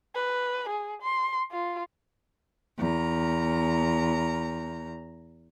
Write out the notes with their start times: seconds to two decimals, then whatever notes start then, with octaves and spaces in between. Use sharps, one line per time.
0.15 B4
0.69 G#4
1.02 C6
1.52 F4
2.79 E2 A#5